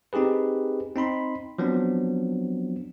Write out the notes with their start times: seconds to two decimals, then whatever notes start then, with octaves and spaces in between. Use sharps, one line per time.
0.13 C4 D#4 G4 G#4 B4
0.96 C4 D#4 B5 C6
1.58 F3 F#3 B3 C4 D4